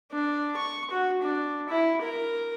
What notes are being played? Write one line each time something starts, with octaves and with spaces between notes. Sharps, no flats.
D4
C#6
F#4
D4
E4
A#4